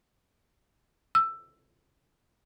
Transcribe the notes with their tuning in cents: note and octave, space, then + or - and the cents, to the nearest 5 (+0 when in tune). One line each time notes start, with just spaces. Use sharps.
E6 +15